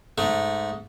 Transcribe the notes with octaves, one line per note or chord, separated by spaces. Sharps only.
G#2 A3